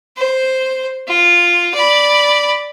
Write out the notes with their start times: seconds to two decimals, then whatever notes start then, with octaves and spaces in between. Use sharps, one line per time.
0.17 C5
1.08 F4
1.74 D5 B5